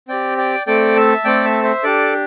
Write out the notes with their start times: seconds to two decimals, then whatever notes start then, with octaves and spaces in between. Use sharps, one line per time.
0.08 C4 G4 D5 G5
0.38 D5 G5
0.66 A3 C4 A4 D5 G5
0.96 E5 A5
1.25 A3 C4 A4 D5 G5
1.45 E5 A5
1.63 C5 E5
1.83 D4 G4 A4 D5